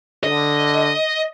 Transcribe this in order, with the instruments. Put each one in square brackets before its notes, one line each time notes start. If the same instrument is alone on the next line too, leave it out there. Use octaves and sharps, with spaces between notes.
[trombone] D3 [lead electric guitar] D#5